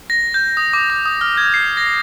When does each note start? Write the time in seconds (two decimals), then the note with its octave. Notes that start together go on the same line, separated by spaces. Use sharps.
0.10 A#6
0.34 G6
0.57 D#6
0.73 D6
0.90 D6
1.06 D#6
1.21 F6
1.37 G#6
1.54 C7
1.77 A#6